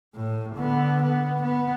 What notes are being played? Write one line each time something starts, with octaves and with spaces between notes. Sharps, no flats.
A2
D3 B3
B3
B3